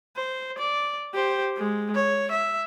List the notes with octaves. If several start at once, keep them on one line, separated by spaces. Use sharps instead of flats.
C5
D5
G4 C5
G#3
C#5
E5